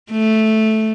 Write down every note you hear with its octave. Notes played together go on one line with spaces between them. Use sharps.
A3